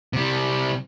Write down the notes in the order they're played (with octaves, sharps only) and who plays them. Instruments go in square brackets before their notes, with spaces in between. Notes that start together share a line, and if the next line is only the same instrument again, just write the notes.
[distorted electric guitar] C3 G3